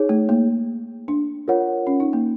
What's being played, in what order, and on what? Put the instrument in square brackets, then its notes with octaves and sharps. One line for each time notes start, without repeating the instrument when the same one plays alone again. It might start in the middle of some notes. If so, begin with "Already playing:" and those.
Already playing: [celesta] D#4 G#4 C#5
[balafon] A3
A#3
D4
[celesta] F4 A#4 C#5 F#5
[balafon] C#4
D#4
A#3